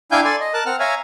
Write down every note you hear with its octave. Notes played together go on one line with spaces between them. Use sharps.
D4 E4 F5 G5 G#5 G6
A4 D5 G#5 C6
D#5
A#4 A5 F#6
C4 F#5 F6
C#5 E5 F5 G#5 A#5